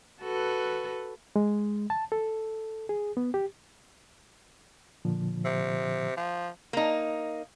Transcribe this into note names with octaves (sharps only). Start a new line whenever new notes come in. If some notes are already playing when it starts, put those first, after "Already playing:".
F#4 A4 B4
G#3
A5
A4
G#4
B3
G4
A#2 D3 F3
C3
F3
A#3 D#4